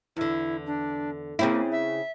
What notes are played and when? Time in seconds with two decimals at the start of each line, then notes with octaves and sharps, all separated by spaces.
0.17 E2 D3 E4
0.66 D4
1.39 C#3 A#3 C4 E4
1.72 E5